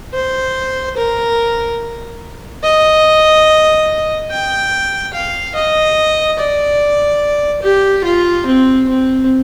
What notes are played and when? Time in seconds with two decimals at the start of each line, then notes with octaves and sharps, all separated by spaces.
0.14 C5
0.97 A#4
2.63 D#5
4.30 G5
5.13 F5
5.55 D#5
6.38 D5
7.62 G4
8.04 F4
8.46 C4
8.88 C4